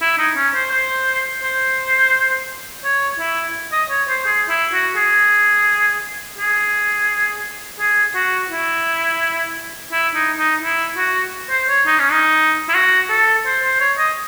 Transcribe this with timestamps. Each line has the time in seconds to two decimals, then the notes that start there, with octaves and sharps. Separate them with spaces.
0.01 E4
0.18 D#4
0.36 C#4
0.55 C5
0.71 C5
1.43 C5
2.84 C#5
3.19 E4
3.72 D#5
3.90 C#5
4.08 C5
4.25 G#4
4.49 E4
4.73 F#4
4.96 G#4
6.38 G#4
7.79 G#4
8.15 F#4
8.50 E4
9.92 E4
10.14 D#4
10.38 D#4
10.62 E4
10.97 F#4
11.50 C5
11.69 C#5
11.86 D#4
11.99 C#4
12.11 D#4
12.69 E4
12.74 F#4
13.10 A4
13.46 C5
13.63 C5
13.80 C#5
13.98 D#5